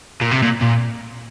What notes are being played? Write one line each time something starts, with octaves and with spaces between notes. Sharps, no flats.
A#2
C3
A#2
A#2